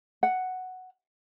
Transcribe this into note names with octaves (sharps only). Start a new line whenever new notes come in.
F#5